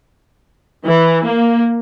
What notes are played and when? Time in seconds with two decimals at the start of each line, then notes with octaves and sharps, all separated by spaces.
0.86 E3
1.26 A#3